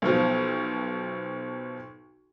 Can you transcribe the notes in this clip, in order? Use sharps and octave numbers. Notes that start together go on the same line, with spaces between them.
B1 B2 F3